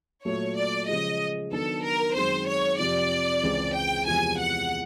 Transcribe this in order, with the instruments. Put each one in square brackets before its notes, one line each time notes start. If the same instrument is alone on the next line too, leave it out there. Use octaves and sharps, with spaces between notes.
[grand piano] A#2 F#3 A3 [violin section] C#5
[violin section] D5
[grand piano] C#3 F3 G#3 [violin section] D#5
[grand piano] D#3 F#3 B3 D4 [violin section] A4
[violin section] A#4
[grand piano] F#2 D#3 G#3 C4 [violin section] C5
[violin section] C#5
[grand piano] F2 C3 F3 [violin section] D5
[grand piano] C#2 C#3 E3 G#3 C4
[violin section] G5
[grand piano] E2 C3 F3 G#3 [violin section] G#5
[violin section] F#5